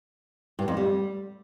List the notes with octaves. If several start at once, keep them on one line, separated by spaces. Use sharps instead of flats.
G2
F2
G3